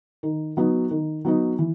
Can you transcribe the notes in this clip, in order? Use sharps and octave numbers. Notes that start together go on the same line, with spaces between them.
D#3
F#3 B3 D#4
D#3
F#3 B3 D#4
E3